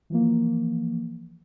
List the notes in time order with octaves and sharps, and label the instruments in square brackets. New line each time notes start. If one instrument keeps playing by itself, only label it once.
[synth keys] E3 F3 A#3